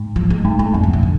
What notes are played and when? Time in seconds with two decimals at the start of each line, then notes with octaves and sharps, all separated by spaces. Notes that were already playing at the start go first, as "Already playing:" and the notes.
Already playing: G#2
0.16 F3
0.30 G#3
0.45 G#2 A3
0.59 G#2 A3
0.74 F2 G#3
0.84 C3
0.93 B2
1.03 D3